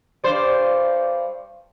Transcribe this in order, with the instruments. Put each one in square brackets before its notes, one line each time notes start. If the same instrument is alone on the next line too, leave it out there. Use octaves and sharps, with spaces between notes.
[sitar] G2 C5 D5